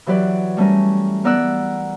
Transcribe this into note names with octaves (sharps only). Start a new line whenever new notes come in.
E3 F#3 G4 B4 D5
G3 A3 C#4 A#4
B3 A#4 D5 F#5 E6 F#6